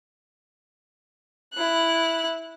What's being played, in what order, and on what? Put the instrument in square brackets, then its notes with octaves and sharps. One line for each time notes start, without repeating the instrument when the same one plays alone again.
[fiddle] E4 F#6